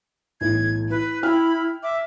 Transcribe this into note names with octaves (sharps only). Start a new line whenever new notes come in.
B1 A2 E3 G#6
E4 B4
E4 G5 B5 F6
E5 D6